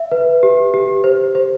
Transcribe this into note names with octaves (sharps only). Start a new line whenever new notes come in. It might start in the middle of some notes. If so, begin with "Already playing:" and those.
Already playing: E5
B4
G4
G4
C5
C5